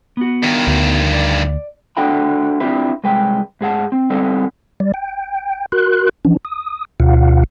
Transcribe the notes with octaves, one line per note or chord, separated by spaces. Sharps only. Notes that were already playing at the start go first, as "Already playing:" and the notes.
B3 F#4
G2 D#3
D2
D5
D4 F#4 A4 F#5 G5 B5
C4 D4 E4 F4 G4 B4
C2 G#3 B4 G5
G#2 G#4 F#5 A5
C4
G3 B3 C4 D#4 A4
G3 D5
G5
F#4 A#4 C6 F#6
E3 F3 C#4 D4
D#6
D2 B2 F4 F5 F#5